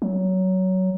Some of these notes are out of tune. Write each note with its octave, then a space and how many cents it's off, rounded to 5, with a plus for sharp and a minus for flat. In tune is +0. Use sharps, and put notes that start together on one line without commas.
F#3 +15